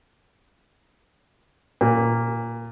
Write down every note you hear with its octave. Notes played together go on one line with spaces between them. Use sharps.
A#2